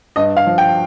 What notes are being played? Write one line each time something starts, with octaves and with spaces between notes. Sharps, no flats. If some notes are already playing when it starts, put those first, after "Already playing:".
G2 D#5
F5
F3
G5